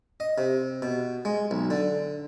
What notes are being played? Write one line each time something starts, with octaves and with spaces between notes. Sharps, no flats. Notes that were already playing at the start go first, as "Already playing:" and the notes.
D#5
C3
B2
G#3
B1
D3